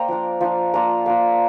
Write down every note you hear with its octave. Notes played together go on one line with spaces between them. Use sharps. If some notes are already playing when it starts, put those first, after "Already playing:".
Already playing: A#3 A#4 C5 D5 G5 A#5
F3 D4 F4
F3 D4 F4
A#3 D4 F4 A#5
A#3 D4 F4